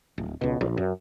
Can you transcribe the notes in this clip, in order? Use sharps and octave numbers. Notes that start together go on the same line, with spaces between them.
D1
C#2 B2
A#1
F#2